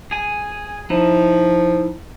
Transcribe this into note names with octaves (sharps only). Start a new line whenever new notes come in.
G#4 G#5
F3 D#4 E4